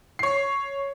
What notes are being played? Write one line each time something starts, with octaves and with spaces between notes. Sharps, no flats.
C#5 C7